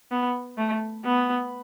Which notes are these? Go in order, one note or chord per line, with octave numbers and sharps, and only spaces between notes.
B3
A3
B3